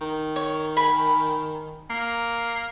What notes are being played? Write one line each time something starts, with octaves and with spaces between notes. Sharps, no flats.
D#3
C#5
G#5 B5
A#3